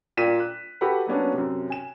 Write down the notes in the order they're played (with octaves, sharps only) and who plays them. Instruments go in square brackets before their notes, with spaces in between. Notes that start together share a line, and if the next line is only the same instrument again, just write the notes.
[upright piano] A#2 D5 G5 B6 D#7 E7
F#6
F#4 G4 A4 B4 F#5 B5
F#3 A#3 B3 C#4 D4
F#2 C3
G#5 E7